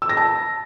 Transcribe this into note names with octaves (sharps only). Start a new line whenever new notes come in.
E6
A#6
A5